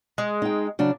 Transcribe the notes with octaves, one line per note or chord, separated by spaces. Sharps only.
G#3
D#4 G5
C#3 F#3 D4